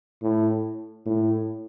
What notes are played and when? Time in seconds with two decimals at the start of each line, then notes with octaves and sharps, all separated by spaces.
0.22 A2
1.06 A2